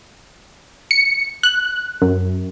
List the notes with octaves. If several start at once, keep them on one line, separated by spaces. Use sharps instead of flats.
C#7
F#6
F#2